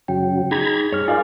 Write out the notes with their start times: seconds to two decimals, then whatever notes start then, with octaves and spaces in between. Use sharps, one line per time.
0.08 F#2 C#3 F#3 G5
0.51 D#4 G#4 A#5 B5 G#6
0.93 G2 G#4 C#5 F6
1.08 D#4 F4 A#4 D5 F5 G#5